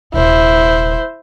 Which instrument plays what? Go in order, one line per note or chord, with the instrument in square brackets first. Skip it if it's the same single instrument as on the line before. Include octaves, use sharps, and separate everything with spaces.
[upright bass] D#1 C3 [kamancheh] E4 C5